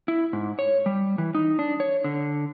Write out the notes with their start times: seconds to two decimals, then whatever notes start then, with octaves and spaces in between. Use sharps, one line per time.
0.08 E4
0.33 G#2
0.59 C#5
0.86 G3
1.18 E3
1.35 D#4
1.59 D4
1.80 C#5
2.04 D3